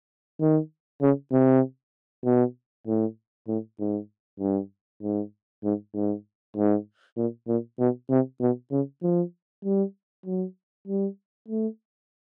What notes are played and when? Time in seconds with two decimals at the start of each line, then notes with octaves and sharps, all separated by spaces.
0.40 D#3
1.02 C#3
1.32 C3
2.25 B2
2.87 A2
3.48 A2
3.79 G#2
4.40 G2
5.02 G#2
5.64 G#2
5.95 G#2
6.57 G#2
7.17 A#2
7.48 A#2
7.79 B2
8.10 C3
8.41 B2
8.72 C#3
9.03 F3
9.64 G3
10.26 F#3
10.88 G3
11.48 A3